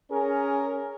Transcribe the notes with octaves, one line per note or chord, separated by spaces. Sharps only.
C#4 G#4 A#4